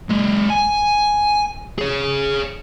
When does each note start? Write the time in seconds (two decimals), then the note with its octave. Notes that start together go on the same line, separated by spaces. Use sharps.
0.10 F#3 G#3
0.50 G#5
1.78 G#4 C#5